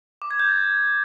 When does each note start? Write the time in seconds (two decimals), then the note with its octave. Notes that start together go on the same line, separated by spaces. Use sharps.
0.22 D6
0.31 G#6
0.39 G6
0.48 A6